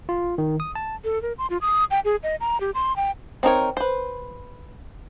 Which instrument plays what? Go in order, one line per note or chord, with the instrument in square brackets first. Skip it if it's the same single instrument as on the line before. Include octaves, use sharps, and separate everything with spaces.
[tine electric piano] F4
D#3
D#6
A5
[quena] A4
A#4
C6
F4
D#6
G5
G#4
D#5
A#5
G4
C6
G5
[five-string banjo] C4 D#4 A#4 C#5
B4 C5